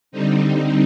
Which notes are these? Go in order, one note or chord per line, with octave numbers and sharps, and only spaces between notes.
D3 G3 C4 D#4